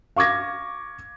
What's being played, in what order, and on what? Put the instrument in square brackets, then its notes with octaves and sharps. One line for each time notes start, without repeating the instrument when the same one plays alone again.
[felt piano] F5 C#6 D6 G#6 A#6